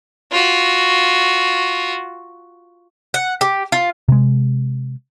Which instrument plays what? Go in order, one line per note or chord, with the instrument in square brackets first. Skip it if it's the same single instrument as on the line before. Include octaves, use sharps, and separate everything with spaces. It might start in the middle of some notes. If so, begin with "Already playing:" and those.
[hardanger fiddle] F4 F#4
[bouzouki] F#5
G4
F4
[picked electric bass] C3 G#3